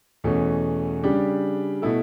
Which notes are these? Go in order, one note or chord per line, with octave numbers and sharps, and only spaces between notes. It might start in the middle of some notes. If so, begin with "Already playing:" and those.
E2 B2 A3 C#4
C#3 G3 D4 G4
B2 A3 E4 A4